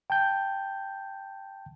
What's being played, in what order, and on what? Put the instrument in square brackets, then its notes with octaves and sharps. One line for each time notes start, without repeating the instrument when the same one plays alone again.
[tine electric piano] G5 A5 G6